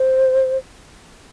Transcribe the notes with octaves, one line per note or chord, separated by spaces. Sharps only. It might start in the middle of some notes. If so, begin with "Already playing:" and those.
Already playing: C5